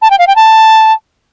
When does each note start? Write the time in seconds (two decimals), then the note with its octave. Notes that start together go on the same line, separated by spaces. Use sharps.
0.02 A5
0.10 G5
0.19 F5
0.27 G5
0.36 A5